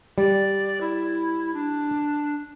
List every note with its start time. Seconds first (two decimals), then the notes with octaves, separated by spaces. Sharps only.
0.18 G3 D5
0.81 E4
1.54 D4